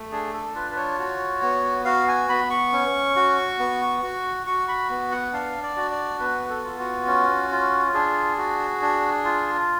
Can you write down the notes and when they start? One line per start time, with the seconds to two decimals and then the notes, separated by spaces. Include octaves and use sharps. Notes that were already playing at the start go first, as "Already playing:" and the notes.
Already playing: A3
0.12 D4 G#4
0.33 A4
0.55 F4 B4
0.72 B4
0.77 C#5
0.99 F#4
1.42 B3
1.85 F#4 F5
2.08 G#5
2.29 B3 B5
2.50 C#6
2.73 C#4
3.16 F#4
3.59 B3
4.03 F#4
4.46 F#4 C#6
4.68 B5
4.90 B3
5.12 F#5
5.33 D4 F5
5.63 D5
5.77 F#4
5.91 D5
6.20 B3 B4
6.49 A4
6.64 F4
6.79 F#4
7.07 C#4
7.51 F4
7.94 D4 G#4
8.38 F#4
8.82 D4
9.24 F4